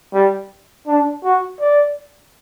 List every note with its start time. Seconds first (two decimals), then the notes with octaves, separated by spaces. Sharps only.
0.14 G3
0.87 D4
1.24 F#4
1.60 D5